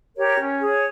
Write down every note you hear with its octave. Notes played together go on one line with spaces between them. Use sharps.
G4 A#4 C#5
C#4
G#4 C#5